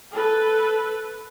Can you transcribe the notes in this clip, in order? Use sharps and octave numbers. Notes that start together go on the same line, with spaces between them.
A4 B4